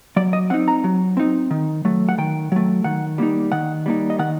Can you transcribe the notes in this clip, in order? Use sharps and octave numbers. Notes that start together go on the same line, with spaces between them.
F#3 D5
D#5
C4 D#4 F#5
A#5
F#3
C4 D#4
D#3
F#3 A3
F#5
D#3 G5
F#3 A3
D#3 F#5
G3 A#3 D#4
D#3 F#5
G3 A#3 D#4
D#5
D#3 F#5